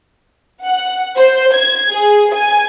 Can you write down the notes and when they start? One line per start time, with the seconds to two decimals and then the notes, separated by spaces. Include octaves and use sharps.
0.66 F#5
1.17 C5
1.54 G#6
1.92 G#4
2.35 G#5